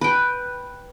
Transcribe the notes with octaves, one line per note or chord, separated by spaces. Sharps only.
B4 G5